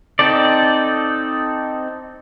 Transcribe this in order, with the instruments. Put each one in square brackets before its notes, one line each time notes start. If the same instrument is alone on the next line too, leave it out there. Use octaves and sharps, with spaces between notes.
[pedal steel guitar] C4 D#4 A4 D5